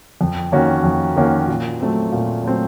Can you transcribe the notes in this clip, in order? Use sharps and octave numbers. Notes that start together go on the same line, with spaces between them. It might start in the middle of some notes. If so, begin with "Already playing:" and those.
F2
D#3 A#3 C#4 F#4
F2
D#3 A#3 C#4 F#4
A#2
F#3 A3 C4
A#2
F#3 A3 C4